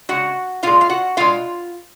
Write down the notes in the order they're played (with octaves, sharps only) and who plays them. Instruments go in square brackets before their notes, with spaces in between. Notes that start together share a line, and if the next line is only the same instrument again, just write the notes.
[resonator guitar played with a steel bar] C#3 G#3 F#4 F#5
A#2 G#3 F4 F5
F5
F#4 F#5
B2 G#3 F4 F5